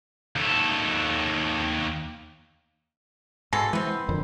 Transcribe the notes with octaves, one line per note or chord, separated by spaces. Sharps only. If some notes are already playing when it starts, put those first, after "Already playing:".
D#2 A4
G#2 B2 G#3 A4 A#6
E3 G#3 B3 C4
B5
G#1 F2 D3 A#4